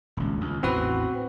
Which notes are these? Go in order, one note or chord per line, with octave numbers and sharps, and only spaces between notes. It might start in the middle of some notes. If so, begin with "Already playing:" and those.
D#1 C#2
C#2
A1 E2 E3 C4 F#4 B4